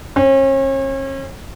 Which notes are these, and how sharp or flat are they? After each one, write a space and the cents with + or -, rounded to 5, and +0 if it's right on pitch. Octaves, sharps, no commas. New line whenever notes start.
C#4 -40